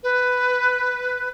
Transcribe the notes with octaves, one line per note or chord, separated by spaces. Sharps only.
B4